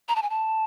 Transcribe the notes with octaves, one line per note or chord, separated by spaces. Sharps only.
A#5
A5
G#5
A5